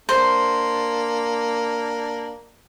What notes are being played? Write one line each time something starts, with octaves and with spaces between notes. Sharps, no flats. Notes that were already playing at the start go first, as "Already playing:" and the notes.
A#3 D4 C5